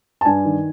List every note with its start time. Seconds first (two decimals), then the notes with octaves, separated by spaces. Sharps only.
0.21 A5
0.25 G2 G#5
0.45 D#3